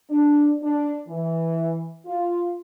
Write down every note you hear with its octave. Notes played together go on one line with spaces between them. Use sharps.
D4
D4
E3
F4